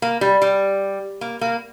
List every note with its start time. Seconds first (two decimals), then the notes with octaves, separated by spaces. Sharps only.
0.02 A#3
0.21 G3
0.42 G3
1.21 A#3
1.41 A#3